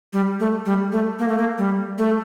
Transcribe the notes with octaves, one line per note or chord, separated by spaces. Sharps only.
G3
A3
G3
A3
A#3
A3
A#3
G3
A3